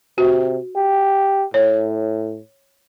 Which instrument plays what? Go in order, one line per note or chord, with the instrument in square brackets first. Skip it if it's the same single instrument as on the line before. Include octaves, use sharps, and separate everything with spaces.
[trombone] C3 [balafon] F#4
[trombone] G4
[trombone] A2 [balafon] C#5